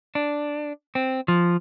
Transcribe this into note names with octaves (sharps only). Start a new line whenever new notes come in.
D4
C4
F3